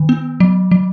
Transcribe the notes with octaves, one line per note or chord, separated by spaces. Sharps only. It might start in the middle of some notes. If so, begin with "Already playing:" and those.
Already playing: D#3
B3
F#3
F#3